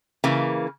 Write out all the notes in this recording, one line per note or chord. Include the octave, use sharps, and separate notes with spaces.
C#3 E3 A#3